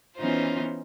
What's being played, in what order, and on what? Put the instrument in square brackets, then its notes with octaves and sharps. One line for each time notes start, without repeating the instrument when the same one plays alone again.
[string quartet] E3 B3 C#4 D#4 F4 C5